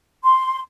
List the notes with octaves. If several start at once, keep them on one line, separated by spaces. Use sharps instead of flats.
C6